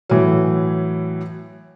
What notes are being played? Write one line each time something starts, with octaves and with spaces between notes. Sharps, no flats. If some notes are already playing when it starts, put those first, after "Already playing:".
A2 E3 F#3